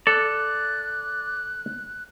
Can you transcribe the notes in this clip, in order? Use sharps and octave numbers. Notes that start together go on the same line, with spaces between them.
A4 D5 F#6